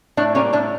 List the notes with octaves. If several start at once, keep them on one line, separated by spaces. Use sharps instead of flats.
A2 D4
G3 A#3 C#4
A2 D4